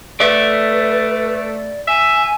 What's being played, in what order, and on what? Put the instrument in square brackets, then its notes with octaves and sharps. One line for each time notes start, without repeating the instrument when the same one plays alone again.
[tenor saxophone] A3 [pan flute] B4 [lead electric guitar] D5 E5
[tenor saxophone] E5 [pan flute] G#5